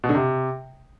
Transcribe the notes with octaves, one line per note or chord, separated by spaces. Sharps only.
B2
D3
C3